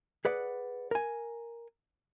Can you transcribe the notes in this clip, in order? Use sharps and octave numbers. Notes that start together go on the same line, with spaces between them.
G#4 B4 D5 F#5
A#4 G#5